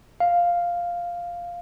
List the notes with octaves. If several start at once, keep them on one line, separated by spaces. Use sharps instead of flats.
F5